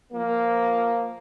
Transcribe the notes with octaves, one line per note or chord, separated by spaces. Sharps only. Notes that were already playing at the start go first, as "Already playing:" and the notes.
F3 A#3